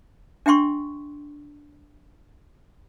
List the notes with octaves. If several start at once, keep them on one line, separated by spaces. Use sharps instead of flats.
D4 E5 G5 C6 C#6